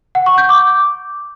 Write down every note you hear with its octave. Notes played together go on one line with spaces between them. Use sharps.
F#5
C#6
G6
D6